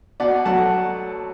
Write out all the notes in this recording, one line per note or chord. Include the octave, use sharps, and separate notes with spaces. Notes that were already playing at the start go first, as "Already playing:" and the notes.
B2 D5 F#5
F#3 A3 F#5 A5